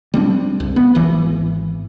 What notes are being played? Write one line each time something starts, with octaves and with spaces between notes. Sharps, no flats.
G3 C4 D4
C2
B3
G#1 E3